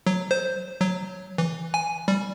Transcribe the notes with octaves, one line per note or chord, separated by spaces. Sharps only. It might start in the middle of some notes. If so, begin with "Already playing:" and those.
F#3
C5
F#3
E3
G#5
G3